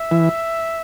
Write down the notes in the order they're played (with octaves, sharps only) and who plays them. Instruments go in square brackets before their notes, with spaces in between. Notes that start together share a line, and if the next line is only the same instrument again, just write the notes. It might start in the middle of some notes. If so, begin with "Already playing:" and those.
Already playing: [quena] E5
[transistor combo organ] E3